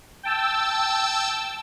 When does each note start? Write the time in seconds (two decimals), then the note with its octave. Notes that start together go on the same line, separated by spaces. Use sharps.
0.23 G5 A5 E6